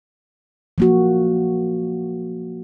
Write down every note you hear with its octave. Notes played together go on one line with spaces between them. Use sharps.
F3 A#3 F#4